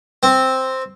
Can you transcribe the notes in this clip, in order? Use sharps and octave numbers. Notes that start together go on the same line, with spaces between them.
C4